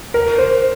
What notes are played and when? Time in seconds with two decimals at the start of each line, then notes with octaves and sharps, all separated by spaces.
0.14 A#4
0.38 C5